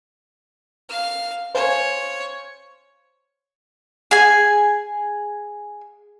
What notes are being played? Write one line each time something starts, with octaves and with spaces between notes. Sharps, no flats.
F5 F6
C5 C#5 F5 G#5
G#4 G#5